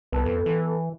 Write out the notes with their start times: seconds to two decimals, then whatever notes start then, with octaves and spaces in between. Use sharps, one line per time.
0.12 C2 B3 A4 B4
0.25 F2
0.46 E3